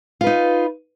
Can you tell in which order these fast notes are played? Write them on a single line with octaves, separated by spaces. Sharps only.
F4 B4 D#4